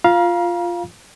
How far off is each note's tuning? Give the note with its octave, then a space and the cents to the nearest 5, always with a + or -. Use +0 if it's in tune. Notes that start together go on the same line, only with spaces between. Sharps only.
F4 +0 F5 +0 A#5 +40